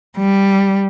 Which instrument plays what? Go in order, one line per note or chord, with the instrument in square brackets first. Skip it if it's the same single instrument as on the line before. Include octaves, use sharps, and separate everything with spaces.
[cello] G3